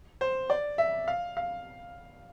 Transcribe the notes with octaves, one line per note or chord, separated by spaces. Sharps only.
C5
D5
E5
F5
F5